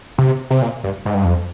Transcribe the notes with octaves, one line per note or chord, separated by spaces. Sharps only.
C3
C3
A#2
G2
G#2
G2
F2